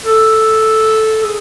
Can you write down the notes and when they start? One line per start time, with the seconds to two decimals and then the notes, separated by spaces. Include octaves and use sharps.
0.05 A4
1.23 G#4